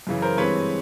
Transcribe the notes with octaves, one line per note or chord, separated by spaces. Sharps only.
F#2 C#3 E3
A#4 C5
G2 E3 G#3 C4 B4 C#5